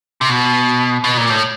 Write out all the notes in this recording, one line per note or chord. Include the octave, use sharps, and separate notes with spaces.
C3
B2
B2
A#2
A2